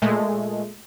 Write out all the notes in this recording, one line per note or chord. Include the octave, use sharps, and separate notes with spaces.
A#2 G#3 A3